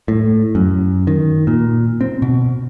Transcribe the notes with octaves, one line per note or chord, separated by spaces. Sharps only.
A2
F#2
D#3
A#2
C4
B2